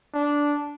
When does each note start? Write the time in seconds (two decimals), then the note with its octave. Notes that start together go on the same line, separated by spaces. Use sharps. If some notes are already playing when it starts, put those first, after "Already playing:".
0.14 D4